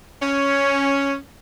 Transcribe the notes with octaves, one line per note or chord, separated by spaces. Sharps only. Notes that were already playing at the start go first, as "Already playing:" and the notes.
C#4